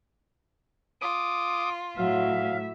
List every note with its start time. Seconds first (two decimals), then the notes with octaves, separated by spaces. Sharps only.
1.01 F4 D6 D#6
1.98 A2 F#3 E5 F5